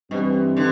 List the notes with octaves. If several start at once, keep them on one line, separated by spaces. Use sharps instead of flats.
G2 B2 E3 G3 C4
D3